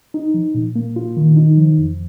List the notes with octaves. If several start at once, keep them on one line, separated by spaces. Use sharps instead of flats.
D#4
F3
A#2
A#3
F4
D#3
D#4
F3
F2